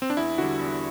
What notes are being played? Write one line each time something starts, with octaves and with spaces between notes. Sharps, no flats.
C4
D4
E2 E4
D3 G3 F#4
E2